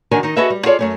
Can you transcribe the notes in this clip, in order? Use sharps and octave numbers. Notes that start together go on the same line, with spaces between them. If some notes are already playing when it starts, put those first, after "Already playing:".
D3 D#3 D4 F#4 A#4 G#5
D#3 D#4
F#4 G#4 A4 B4 D#5 E5
G3
F4 G#4 A4 C#5 D5
F#2 A3 C#4